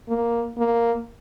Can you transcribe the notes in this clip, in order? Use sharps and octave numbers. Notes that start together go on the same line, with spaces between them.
A#3
A#3